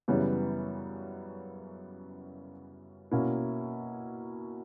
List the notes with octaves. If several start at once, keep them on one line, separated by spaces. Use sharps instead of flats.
F#2 C#3 E3 G3 B3
B2 A#3 C#4 E4